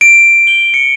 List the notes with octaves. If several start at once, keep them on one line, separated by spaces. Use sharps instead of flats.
D7
G7
C#7